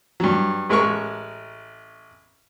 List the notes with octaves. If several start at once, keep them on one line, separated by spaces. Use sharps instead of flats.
G2 F#3
A1 G#3 A#4 C#6